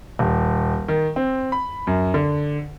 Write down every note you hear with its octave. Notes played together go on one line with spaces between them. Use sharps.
D#1
D#3
C4
B5
F#2
D3